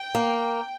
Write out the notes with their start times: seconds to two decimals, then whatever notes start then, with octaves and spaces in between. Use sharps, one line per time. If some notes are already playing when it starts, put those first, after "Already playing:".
Already playing: G5
0.15 A#3